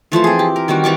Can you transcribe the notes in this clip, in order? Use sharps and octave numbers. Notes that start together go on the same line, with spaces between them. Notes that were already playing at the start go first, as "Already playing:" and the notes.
E3 F3 A3 C5
C4 G#4
G4
A#4
D#3 G3 C4 F#4
E3 G3 C#6 D6